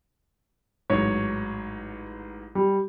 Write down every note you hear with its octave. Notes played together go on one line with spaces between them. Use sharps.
A1 G#2 F#3 C#5
G3